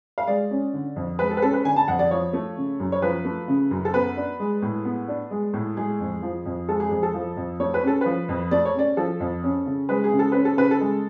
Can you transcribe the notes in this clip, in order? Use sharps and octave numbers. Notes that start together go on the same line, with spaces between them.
F5
G#3 D5
C#4
D3
F2
G#3 B4
A4
B4
C#4 A4
B4
D3 G#5
A5
F2 F#5
D5
F3 C#5
A3
C#3
F#2
C#5
F3 B4
A3
C#3
F#2
A4
B3 B4
D4
G#3
A2
B3
D4
G#3
A2
G#3 G#4
F2
F3
F2
G#3 A4
G#4
F2 G#4
A4
F3
F2
A3 C#5
B4
C#4 A4
F3 B4
F2
A3 D5
C#5
C#4 D5
F3 A4
F2
C#4
C#3
G#3 B4
G#4
C#3
A4
C#4 B4
A4
C#3 B4
A4
G#3